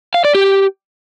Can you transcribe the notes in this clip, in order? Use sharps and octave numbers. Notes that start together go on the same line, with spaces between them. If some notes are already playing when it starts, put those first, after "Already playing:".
F5
D5
G4